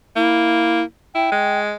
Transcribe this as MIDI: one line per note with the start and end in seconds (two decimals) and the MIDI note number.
0.16 0.81 58
0.16 0.83 64
1.15 1.31 64
1.15 1.59 79
1.32 1.76 56